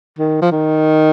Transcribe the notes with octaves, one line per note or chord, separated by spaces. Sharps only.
D#3
F3
D#3